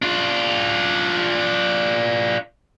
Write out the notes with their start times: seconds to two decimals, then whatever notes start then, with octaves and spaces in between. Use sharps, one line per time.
0.02 D4 F4